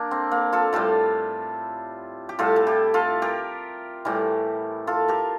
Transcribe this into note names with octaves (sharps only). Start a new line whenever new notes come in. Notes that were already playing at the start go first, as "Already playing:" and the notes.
Already playing: A#3 D4
C4
A#3
F4 A4
A2 G3 F4 A4
G4
A2 G3 F4 A4
A4
E4 G4
F4 A4
G4 A#4
A2 E3 G3
F4 A4
G4 A#4